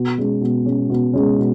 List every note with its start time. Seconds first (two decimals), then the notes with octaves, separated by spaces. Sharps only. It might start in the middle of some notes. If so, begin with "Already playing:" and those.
Already playing: B2
0.18 G#3 C#4
0.41 B2
0.65 G#3 C#4
0.90 B2
1.13 G#3 C#4
1.38 B2